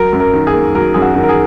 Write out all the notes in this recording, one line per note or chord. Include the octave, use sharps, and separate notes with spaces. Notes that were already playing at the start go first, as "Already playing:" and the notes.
Already playing: F#3 A#4
F#2
A#4
D#3
G#4
A#3
F#3 A#4
F#2 G#4
F#4
D#3
A#4
G#4